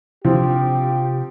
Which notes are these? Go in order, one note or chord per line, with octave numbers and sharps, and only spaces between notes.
C3 F3 C4 D4 G4